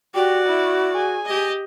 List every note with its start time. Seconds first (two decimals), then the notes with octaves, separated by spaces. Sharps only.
0.15 F#4 G4 D5
0.46 E4
0.92 G#4 G#5
1.26 G4 D#5